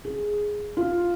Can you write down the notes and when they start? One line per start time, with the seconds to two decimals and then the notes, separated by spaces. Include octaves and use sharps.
0.05 G#4
0.77 F4